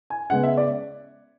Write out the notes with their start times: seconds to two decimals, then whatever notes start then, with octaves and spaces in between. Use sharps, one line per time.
0.10 G#5
0.30 C#3 G#3 B3 F#5
0.43 E5
0.57 D5